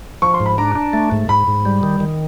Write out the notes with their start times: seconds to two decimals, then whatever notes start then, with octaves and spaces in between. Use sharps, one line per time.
0.22 F3 C#6
0.34 C6
0.40 G#2
0.46 B5
0.58 D4 A#5
0.75 D4
0.93 A3
1.11 G#2
1.29 G#2 B5
1.47 G#2
1.65 G3
1.83 D#3
2.00 D#3